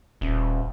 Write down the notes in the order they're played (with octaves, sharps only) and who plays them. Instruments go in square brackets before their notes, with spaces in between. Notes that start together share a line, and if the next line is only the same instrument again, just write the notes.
[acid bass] D#1